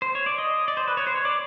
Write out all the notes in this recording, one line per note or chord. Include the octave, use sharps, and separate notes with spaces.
C5
C#5
D5
D#5
D5
C5
B4
C#5
C5
C#5
D5